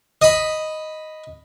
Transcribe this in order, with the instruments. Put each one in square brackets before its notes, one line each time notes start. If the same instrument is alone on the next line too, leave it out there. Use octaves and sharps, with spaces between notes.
[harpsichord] D#5 B5